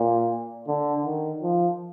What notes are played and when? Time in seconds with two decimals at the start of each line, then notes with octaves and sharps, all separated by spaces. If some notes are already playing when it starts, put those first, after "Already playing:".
Already playing: A#2
0.67 D3
1.05 D#3
1.42 F3